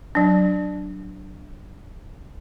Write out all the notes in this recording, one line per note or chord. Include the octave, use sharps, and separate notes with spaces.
F#3 D4